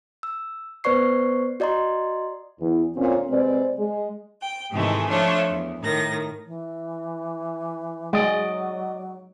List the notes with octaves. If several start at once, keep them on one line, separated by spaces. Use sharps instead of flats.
E6
B3 B4 C5 D5 C#6 C7
F#4 D5 D#5 A#5 C6
E2 E3
D2 A#2 C4 C#4
C3 G#3 C4 B4 C5 D5
G#3
G5
G#2 C3 D#3 E3 G#3 A3
F3 A3 D4 F4 C#5 E5
E2
A2 D#3 A#6
E3
F#3 G#3 D5 D#5